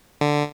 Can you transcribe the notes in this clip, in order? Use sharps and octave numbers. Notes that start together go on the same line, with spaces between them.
D3